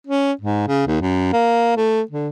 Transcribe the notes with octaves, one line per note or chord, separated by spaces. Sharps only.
C#4
G#2
C#3
D#2
F#2
A#3
A3
D3